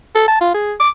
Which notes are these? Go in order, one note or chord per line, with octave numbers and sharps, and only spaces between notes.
A4
A5
F4
G#4
D6